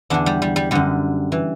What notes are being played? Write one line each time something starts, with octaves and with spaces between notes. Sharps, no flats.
E2 D3 D4
G3
G3
G3
F#2 D3 G3
E3